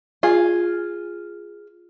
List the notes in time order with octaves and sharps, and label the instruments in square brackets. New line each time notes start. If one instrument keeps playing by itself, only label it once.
[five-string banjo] F4 G#4